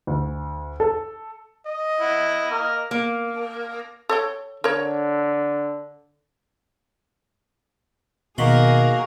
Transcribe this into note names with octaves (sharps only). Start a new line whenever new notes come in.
D2
A4
D#5
E4 F#5
A#3 F6
A#3
A4 C#5 G5
D3 A#4 C#5
B2 D#3 A#3 F#4 G#4 A#4 B5 C6